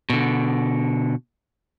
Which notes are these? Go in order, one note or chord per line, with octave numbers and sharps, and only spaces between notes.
B2 D3